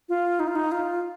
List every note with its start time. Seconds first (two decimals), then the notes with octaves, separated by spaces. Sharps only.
0.09 F4
0.40 D#4
0.48 F4
0.56 D#4
0.72 F4